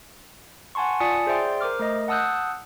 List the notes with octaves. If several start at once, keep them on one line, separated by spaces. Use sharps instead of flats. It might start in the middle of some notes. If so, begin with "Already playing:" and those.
F#5 G#5 A5 C6 C#6
F4 D5 G#5 A5 D#6 C#7
G#4 C5 D5 E5 G5 C6
A#4 C5 D6 F6
A3 A#4 D#5
F#5 A5 D#6 E6 F#6 G6